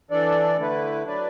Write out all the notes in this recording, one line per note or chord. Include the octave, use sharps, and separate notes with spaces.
E3 D4 A4 D5
D3 A3 E4 B4
F#3 D4 B4 D5